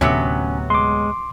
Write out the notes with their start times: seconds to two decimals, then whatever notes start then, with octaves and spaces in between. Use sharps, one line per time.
0.01 D2 A2 C3 F#3 B3 C#4
0.70 G#3 C6 D6